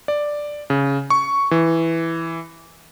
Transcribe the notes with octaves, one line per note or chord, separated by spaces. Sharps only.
D5
C#3
C#6
E3